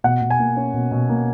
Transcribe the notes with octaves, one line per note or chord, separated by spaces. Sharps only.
B2 F#5
B2
G#5
A#3
C#4
B2
B2
A#3